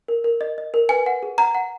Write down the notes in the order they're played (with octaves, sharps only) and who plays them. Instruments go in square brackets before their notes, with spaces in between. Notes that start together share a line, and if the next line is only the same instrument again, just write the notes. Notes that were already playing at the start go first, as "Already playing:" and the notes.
[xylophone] A#4
A#4
D#5
D#5
A#4
B4 G#5
F#5
G#4
F#5 A#5
F#5